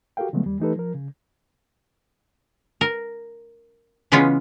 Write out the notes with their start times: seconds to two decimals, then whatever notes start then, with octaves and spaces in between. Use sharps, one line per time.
0.17 F#4 G4 A4 A#4 F5 G5
0.33 C#3 F3 F#3 G#3 A3 B3
0.46 D#2 G3
0.60 E3 A3 D#4 G4 A4 B4
0.76 F3 A#4
0.94 C#3
2.81 A#4
4.12 C#3 E3 G#3 B3 C#4 F4